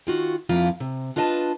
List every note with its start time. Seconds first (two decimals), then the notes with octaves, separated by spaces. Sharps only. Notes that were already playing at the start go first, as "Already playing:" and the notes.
0.07 D#3 F4 F#4
0.49 F2 F3 A#3 E4 F4 A#5
0.80 C3
1.16 D4 F4 B4 D#5 G#5 A5